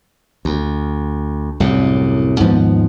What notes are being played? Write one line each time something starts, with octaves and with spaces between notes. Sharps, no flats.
D2
C2 F#2 A2
D#2 G#2 F3 B3